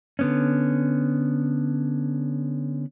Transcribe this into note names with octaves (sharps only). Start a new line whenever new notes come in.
D3 B3 C#4